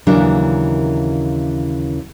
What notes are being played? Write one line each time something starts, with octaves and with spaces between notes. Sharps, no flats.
D#2 C#3 E3 F#3 D4 A#4